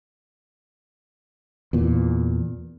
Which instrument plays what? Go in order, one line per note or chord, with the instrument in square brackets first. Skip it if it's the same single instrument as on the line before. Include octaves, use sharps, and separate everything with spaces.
[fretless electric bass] E2 A#2